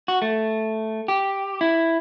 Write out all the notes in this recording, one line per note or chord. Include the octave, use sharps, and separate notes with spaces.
F#4
A3
G4
E4